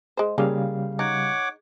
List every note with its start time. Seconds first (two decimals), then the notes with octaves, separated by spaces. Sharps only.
0.17 G#3 C5
0.38 C#3 G3 A#3 G#4 F5
0.99 D#4 C#5 F#5 D6